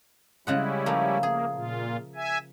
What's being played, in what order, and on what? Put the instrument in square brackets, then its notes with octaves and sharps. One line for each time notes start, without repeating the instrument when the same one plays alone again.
[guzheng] C#3 G#3 F#5 [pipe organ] G3 C#4 E4
[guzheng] F3 A3 A#3
[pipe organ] A#3 [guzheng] G#4
[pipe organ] A#2 F4
E5 G#5